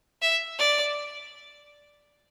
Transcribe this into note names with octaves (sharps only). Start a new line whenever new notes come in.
E5
D5